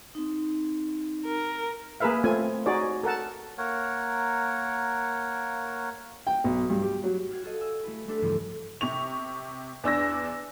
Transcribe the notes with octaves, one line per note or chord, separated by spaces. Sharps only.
C4 D#4
A#4
A#3 G#4 A#4 B4 E5 F5
A3 C4 F4 G#5
D#4 F#4 G#4 C#5 D5
A4 A#4 F#5 A5
A#3 A#4 C#5 F#5
G5
B1
G2
G4
F#3
G4 F5 F#5 G#6 C7
F#4 A4 D#5
G#5 E6
A3 E4 B4
A3 C4 D4 G4 A4 B4
C#2 G2 C#3 E3 F3 C4
C3 C#6 F7
E2 D4 E6 A#6